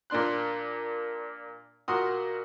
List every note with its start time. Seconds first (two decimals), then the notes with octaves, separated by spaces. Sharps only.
0.10 A#2 A#3 D4 C6 F#6
1.88 A#2 F#4 A#4 F#5 C6 D#6